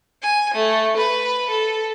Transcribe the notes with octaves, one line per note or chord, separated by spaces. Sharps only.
G#5
A3
B4
A4